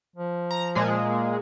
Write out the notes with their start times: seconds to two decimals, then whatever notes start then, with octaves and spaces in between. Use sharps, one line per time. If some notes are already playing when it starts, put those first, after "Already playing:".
0.16 F3
0.51 A#5
0.75 A#2 G#3 G#4
1.06 A#3